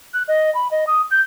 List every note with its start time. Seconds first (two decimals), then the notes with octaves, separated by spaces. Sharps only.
0.14 F#6
0.28 D#5
0.55 B5
0.71 D#5
0.87 D#6
1.11 G6